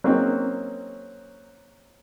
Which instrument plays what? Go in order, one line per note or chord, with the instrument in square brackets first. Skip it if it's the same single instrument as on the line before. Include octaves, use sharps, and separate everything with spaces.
[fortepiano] F#3 A#3 C4 C#4 D#4 G#4